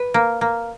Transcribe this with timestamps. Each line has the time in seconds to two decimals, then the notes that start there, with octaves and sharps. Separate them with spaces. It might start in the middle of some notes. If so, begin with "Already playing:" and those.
Already playing: B4
0.14 A#3
0.41 A#3